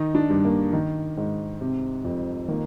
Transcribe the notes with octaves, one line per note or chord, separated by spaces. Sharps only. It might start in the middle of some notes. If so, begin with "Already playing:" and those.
Already playing: D#3 D#4
D4
G2
A#3
D#3
G#2
C3
F2
D#3 A#3